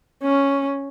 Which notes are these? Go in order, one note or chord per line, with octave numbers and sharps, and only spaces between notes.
C#4